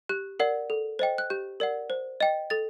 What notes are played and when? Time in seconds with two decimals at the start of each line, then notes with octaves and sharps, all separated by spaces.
0.09 G4 F#6
0.40 A#4 D5 F#5
0.70 A4
0.99 C5 D#5 G5
1.18 F#6
1.30 G4 G6
1.60 A#4 D5 F#5
1.90 C5
2.20 D#5 G5
2.50 A4 A6